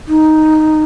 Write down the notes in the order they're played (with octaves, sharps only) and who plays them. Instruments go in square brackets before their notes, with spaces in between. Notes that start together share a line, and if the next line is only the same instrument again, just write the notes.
[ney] D#4